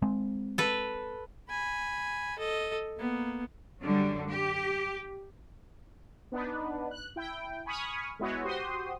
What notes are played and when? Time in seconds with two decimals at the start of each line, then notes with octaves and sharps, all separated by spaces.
0.02 G#3 C4
0.58 A4 B4
1.49 G#5 B5
2.38 A4 D#5
2.97 A#3 B3
3.82 F#2 D3 G3
4.28 G4
6.32 B3 D4 D#4 B4
6.91 F#6
7.16 E4 G5
7.66 G#5 B5 C#6 D#6 F6
8.19 G#3 B3 E4 F#4 C#5
8.44 F#4 G4 C5 C6 D#6